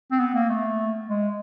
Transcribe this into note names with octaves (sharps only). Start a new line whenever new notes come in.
C4
B3
A#3
A3
G#3